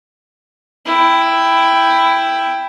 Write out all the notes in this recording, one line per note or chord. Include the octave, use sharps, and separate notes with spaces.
E4 G5